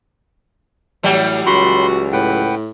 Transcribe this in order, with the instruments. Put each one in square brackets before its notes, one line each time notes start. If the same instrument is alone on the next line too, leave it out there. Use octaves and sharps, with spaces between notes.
[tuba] A2 [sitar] E3 F#3 G3
[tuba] C#2 [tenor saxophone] F#4 [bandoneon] B5 C6
[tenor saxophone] A2 [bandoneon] B4 F#5 G5